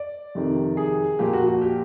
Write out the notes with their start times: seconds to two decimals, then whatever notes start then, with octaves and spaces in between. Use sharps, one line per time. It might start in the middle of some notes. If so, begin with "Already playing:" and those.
Already playing: D5
0.35 F2 C3 D#3
0.77 G#4
1.19 A#2 F3 A#3 G4
1.33 F#4
1.47 F#4
1.61 G4